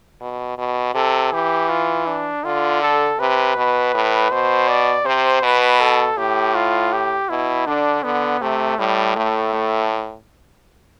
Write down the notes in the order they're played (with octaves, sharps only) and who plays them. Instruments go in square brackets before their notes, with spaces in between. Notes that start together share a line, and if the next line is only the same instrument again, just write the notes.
[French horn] B2
B2
[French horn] C3 [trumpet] A4
[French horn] E3 [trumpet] G4
[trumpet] F4
D4
[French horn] D3 [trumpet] F4
[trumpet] A4
[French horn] C3 [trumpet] B4
[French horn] B2
A2
[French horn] B2 [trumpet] C5
[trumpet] D5
[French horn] C3 [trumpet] C5
[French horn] B2 [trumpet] B4
[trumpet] A4
[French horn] A2 [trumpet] G4
[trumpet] F4
G4
[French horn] B2 [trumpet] E4
[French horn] D3 [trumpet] D4
[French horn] D3 [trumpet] B3
[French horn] C3 [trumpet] A3
[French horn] A2 [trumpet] G3
[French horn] A2 [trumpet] A3
[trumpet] A3